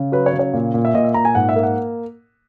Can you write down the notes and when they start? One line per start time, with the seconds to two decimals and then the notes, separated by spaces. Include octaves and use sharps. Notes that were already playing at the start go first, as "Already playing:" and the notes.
Already playing: C#3
0.12 F#3 B4
0.26 C#5
0.33 C#3
0.39 C#5
0.53 A#2
0.74 A#2
0.85 E5
0.94 A#2 D#5
1.04 E5
1.14 A#2 A#5
1.25 G#5
1.35 G#2 F#5
1.49 E5
1.56 A#3
1.63 F#5